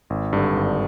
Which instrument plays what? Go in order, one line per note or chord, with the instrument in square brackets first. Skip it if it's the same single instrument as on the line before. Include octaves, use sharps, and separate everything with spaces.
[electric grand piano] G#1
G2 D3
G#1